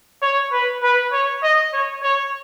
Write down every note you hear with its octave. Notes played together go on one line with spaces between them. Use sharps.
C#5
B4
B4
C#5
D#5
C#5
C#5